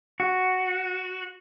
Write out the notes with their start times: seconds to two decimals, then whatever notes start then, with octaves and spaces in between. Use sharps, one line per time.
0.20 F#4